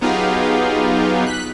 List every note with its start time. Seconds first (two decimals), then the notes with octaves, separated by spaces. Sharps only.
0.01 F#3 B3 D#4 F4 G4 G#4
1.27 F#6 B6